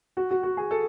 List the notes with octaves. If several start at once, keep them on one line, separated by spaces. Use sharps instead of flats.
F#4
F#4
F#4
G#4
A4